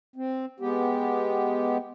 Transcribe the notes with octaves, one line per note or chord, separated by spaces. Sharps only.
C4
G#3 B3 G4